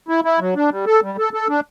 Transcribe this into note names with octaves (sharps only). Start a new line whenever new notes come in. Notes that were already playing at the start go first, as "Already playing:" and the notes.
E4
E4
F#3
D4
G3
A4
G3
A4
A4
D4